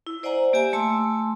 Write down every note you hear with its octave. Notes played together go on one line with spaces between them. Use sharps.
E4
C5 D5 D#5 F#5 G#5 A#5
A#3 G4 E5 G#5
A3 G#5 A5 C6 E6